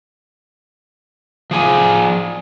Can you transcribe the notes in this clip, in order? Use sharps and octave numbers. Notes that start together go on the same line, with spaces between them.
F3 G#4